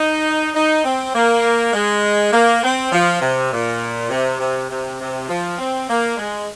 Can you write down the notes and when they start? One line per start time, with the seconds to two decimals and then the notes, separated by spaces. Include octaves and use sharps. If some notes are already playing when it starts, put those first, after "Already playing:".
Already playing: D#4
0.55 D#4
0.84 C4
1.15 A#3
1.73 G#3
2.33 A#3
2.63 C4
2.92 F3
3.21 C3
3.51 A#2
4.10 C3
4.40 C3
4.70 C3
5.00 C3
5.28 F3
5.59 C4
5.88 A#3
6.17 G#3